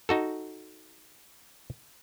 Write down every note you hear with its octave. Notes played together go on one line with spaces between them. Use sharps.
D#4 F#4 A4